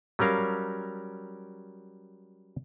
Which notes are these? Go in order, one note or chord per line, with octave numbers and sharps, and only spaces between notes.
F#3 G3 C#4 A#4 F5